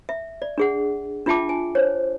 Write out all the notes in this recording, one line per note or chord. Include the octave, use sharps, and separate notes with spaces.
E5
D5
D4 G#4 F#5
D4 F4 E5 G5 A5 D6
G#5
C5 C#5